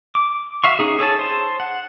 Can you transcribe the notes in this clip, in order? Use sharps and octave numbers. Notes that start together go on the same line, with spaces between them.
D6
F#4 E5 F5 C#6
C#4 D#4 G#4
G#4 A4 C#5 A5
C5 A5
F#5